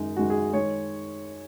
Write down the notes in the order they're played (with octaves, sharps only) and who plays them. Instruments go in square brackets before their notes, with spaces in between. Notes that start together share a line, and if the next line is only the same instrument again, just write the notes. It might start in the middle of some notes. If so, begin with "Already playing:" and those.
Already playing: [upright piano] F#2 D#3 G#3 D#4
F#2 D#3 G#3 F#4
G#4
D#3 G#3 C#5